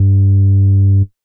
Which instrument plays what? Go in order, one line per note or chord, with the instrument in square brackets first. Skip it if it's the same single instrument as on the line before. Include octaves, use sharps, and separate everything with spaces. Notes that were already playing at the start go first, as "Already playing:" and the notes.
Already playing: [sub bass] G2